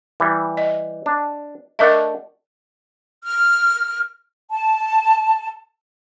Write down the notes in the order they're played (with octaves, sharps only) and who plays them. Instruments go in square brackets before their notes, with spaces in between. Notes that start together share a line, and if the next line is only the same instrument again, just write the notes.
[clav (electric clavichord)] E3 G3
[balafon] D#5
[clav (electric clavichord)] D4
[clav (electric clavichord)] A3 D4 F#5 [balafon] A#4 D#5 E5
[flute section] F6
A5